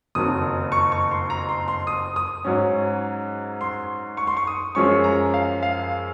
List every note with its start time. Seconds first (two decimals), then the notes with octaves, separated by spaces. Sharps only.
0.15 F#1 F2 D#3 F#3 D#6
0.72 C#6
0.92 C#6
1.11 C6
1.30 A#5
1.49 C6
1.68 C6
1.87 D#6
2.16 D#6
2.45 G#2 F#3 C#4
3.61 C6
4.17 C#6
4.27 C6
4.37 C#6
4.47 D#6
4.75 F#2 F3 G#3 C#4 C#6
5.04 A#5
5.34 F5
5.63 F5